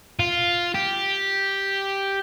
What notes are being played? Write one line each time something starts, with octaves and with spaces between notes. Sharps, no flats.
F4
G4